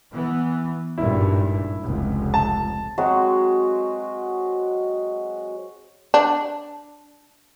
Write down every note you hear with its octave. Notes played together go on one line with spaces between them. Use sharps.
E3 B3
G#1 G2 A#2 E4
F1 C#2
A5
F#3 G#3 C4 F#4
D4